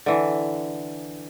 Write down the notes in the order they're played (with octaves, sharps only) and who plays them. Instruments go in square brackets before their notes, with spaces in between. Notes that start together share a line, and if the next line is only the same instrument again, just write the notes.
[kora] D3 E3